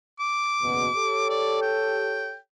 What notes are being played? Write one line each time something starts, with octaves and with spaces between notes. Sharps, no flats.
D6
F#1 E2 B2
G4 A4 C#5
D5
G5